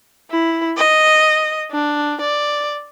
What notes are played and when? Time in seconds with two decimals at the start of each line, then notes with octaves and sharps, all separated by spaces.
0.31 E4
0.77 D#5
1.71 D4
2.21 D5